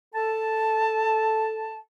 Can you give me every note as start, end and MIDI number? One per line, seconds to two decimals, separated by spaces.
0.14 1.77 69
0.14 1.77 81